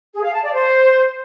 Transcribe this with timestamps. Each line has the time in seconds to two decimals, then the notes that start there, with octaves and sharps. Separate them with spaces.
0.14 G#4
0.23 F5
0.33 A5
0.43 D5
0.52 C5